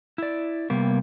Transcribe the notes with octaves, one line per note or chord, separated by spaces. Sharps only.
E4 D5
C3 G3 A#3 B3